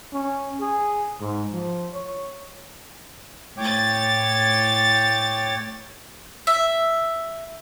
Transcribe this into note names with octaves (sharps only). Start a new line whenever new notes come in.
C#4
G#4
G#2
F3
C#5
A2 C#5 G5 D6 A6
E5